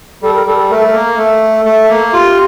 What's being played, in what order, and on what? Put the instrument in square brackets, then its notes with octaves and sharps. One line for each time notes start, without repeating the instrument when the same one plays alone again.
[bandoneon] G3 [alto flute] A4
[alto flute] A#4
[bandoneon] G3 [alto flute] A4
[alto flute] A4
[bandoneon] A3 [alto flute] A#4
[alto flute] A4
A#4
[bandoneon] A#3
[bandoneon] A3 [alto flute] A4
[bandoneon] A3
A#3
[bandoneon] F4 [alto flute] G4